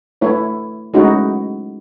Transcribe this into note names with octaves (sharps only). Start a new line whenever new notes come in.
A3 E4 B4 C#5
G#3 A3 C#4 D#4 E4 F#4